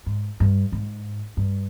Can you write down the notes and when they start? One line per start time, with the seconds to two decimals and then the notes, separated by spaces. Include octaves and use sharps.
0.06 G#2
0.40 G2
0.72 G#2
1.37 G2